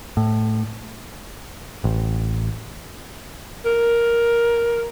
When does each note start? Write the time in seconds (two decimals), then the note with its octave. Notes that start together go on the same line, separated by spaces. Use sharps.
0.17 A2
1.84 A1
3.65 A#4